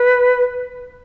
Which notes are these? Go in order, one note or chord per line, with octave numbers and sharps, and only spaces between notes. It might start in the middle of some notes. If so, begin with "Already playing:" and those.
Already playing: B4